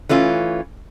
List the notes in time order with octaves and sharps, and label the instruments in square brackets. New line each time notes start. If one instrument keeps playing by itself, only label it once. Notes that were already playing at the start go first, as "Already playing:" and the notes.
[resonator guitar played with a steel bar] E3 A3 C#4 F4